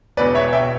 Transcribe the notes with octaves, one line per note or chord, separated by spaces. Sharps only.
E1 E2 B2 B4 D5
C#5 E5
E1 B2 E5 G5